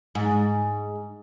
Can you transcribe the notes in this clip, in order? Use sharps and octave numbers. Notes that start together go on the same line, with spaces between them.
G#2